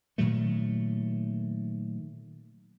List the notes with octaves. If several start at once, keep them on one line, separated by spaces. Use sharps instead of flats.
A#2 D#3 F#3 A3